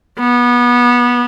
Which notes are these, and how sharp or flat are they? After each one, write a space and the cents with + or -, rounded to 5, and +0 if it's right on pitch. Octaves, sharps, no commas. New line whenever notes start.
B3 -25